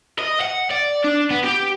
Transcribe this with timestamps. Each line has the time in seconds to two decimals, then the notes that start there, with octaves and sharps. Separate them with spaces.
0.19 D#5
0.41 F#5
0.71 D5
1.04 D4
1.30 B3
1.44 G4